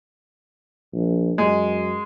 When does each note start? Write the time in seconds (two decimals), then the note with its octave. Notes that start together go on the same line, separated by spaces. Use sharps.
0.93 A#1
1.38 F#2 G#3